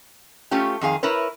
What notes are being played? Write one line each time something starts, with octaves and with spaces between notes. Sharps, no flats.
A3 C#4 F4 G4
F2 D#3 G#4 F5
E4 A#4 B4 C#5